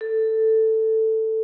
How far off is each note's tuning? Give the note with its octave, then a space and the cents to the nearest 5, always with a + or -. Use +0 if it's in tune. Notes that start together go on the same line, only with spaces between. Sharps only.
A4 +10